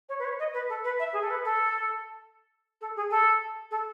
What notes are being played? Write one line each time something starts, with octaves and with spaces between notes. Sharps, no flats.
C#5
B4
C#5
D#5
B4
A4
B4
E5
G#4
A4
B4
A4
A4
G#4
A4
A4